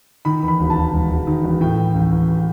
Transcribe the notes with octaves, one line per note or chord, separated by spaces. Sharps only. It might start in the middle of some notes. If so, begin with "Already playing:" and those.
D#3 B5
E2
B5
E1
A5
E1
E1
E1
D#3
E1
A2 G5
E3
A1
A1